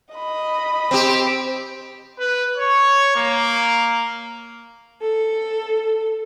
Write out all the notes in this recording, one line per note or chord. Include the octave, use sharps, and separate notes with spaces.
D#5 B5
C4 G4
B4
C#5
A#3
A4